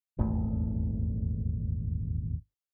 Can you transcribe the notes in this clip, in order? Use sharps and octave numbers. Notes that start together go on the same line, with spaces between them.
D#1 G#1 E2 A3